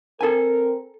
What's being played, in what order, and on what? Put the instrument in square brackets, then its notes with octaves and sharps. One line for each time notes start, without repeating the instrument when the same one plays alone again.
[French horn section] C4 A#4 [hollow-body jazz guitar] A4 G#5